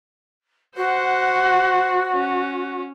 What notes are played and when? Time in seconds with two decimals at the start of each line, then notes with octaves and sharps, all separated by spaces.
0.77 F#4 C5 F#5
2.12 C#4